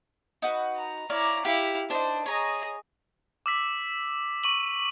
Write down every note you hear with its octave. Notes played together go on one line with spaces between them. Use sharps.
D#4 F#4 B4
A#5
E4 C#5 D5 F5 A#5
E4 G4 F5
D4 D#4 C5
G#4 C#5 D#5 A#5
D6 E6 B6
C#6 D#7 F#7